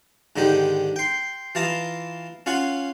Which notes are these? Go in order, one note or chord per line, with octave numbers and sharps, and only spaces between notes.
G#2 D3 D#3 D#4 G4
G5 C6
E3 F4 A5 A#5 D#6
C#4 F4 F#5 G#5